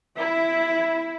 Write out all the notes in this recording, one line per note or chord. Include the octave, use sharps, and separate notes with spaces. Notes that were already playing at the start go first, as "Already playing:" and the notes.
E4 E5